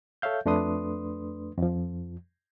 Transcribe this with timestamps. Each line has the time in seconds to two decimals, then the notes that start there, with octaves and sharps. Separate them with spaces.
0.22 A4 C#5 E5 F5 G6
0.46 F2 A3 D4 B4 C6 D#6
1.58 F2 F3